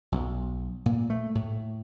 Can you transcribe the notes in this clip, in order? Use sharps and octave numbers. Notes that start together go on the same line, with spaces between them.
B1
A#2
A3
A2